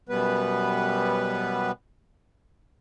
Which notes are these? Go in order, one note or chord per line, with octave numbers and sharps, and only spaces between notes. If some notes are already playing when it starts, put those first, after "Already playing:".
F#2 B2 G3 B3 B4